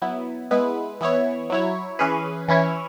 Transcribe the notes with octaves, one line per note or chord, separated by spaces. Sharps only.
F#3 B3 E4
G#3 B3 E4 G#4 B4
E3 B3 E4 C#5
F#3 E4 C#5
E3 C#4 G#4 B4
E3 C#4 E4 C#5